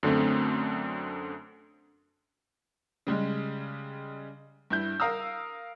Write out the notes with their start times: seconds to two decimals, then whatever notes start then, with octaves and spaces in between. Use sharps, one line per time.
0.03 F#2 D3 A3 C4
3.07 C#3 G3 G#3
4.70 G2 E4 G6
5.00 A#4 F5 A#5 D#6 E6